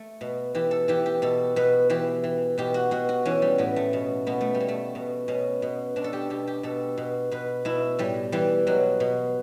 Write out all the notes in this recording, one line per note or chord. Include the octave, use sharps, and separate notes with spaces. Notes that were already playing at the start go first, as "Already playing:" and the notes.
Already playing: A3
B2
E3 G4
A4
E3 G4
G4
B2 A4
B2 B4
E3 G4
E3
B2 G4
F#4
B2 F#4
F#4
E3 C#4
G3
A2 B3
A3
B2
B2 B3
A3
G3
B2
A3
B2
B2 C#4
B2
B2 D4
A4
G4
B2 G4
G4
B2 A4
B2
B2 B4
B2 E4
A2 G3
E3 G3
B2 F#3
B2